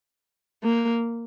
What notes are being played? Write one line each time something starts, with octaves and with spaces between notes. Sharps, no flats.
A#3